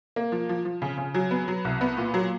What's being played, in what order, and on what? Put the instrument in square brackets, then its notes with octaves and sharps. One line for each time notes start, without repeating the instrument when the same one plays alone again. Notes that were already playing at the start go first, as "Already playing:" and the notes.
[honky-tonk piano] A#3
F3
F3
F3
C#3
C#3
F#3
B3
F#3
C2
B3
A#2
F#3